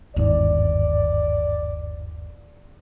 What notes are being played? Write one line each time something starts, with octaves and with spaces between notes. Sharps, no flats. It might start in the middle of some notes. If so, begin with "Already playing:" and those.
G1 D#2 G#2 D5